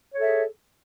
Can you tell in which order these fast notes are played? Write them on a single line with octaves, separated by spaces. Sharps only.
C#5 A4 G#4 E5